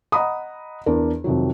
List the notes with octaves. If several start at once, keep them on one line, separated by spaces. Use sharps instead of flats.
D#5 F#5 A#5 B5 D#6
E2 D4 A#4
F2 C3 D#3 F#3